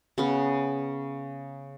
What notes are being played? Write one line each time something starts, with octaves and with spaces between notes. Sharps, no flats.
C#3 B3